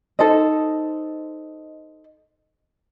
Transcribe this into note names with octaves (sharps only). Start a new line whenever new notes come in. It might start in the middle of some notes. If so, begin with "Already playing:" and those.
D#4 A4 C5 D#5